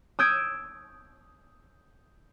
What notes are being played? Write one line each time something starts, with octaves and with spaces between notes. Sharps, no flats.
D#6 E6 G6 G#6 D7